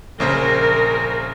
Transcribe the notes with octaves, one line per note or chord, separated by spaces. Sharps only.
A#1 C#3 A#4 C5